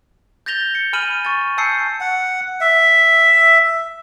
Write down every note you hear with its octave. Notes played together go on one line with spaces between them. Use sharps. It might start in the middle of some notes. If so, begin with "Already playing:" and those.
G6 A6 A#6 F7 G7
C#7
G#5 B5 F6 D#7 E7 F#7
C#6 A6
G#5 A5 E6 G6 C7 C#7
F#5
E5